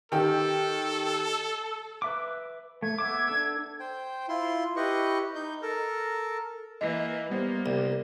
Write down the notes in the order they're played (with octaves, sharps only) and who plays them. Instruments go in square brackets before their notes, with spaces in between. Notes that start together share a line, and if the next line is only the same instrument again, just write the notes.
[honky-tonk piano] D#3 G4 [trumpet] A4
[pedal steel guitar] B4 E5 D6
[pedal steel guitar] A3 [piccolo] G#6
[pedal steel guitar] B3 E5 D6
D4 A4 E6
[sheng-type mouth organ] C5 G5
E4 F4 C6
E4 G4 B4 D#5 C#6
D#4 G6
A4 A#4
[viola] E3 A#3 [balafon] D#5
[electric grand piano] G3 B3 C5 [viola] A#3
[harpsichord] C2